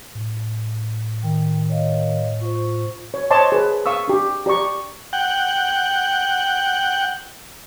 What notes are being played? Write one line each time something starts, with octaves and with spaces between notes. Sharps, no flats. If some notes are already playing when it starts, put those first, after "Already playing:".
A2
D#3 G5
C#5 D#5 F5
F4 C5 C#6
C#5
C5 C#5 D#5 A5 C6 D6
G#4 B4
F5 C#6 D#6 E6
D4 G4
G4 D5 A#5 C#6
F#5 G5